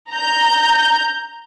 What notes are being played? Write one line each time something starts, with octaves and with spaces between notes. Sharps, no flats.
A#5 G6